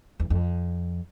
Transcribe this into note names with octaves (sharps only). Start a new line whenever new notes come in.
E2
F2